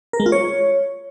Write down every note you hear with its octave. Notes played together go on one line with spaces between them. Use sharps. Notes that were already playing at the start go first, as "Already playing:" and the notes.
A#4
G#3
F4
C#5